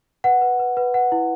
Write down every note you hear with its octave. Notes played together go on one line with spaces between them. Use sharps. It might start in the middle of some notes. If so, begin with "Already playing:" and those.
B4 F#5
B4
B4
B4
B4 F#5
E4